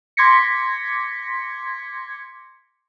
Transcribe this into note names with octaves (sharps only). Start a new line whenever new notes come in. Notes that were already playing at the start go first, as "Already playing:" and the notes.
C6 D6 G#6 A#6 B6 C#7